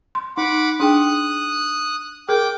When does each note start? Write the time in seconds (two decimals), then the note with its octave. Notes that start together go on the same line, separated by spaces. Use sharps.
0.15 C6
0.37 D#4 F#5 B5 D6
0.80 D4 G#4 G5 D#6 F#6
2.29 G#4 A#4 G5 D6